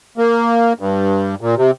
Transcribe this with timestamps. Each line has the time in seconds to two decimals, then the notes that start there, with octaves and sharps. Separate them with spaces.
0.18 A#3
0.80 G2
1.41 A#2
1.57 C3